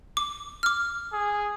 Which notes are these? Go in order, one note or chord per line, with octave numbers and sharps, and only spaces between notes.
D6
D6 F6
G#4